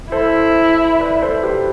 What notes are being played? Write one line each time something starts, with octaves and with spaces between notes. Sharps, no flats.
E4 A4 C5
B4 D5
A4 C5
G4 B4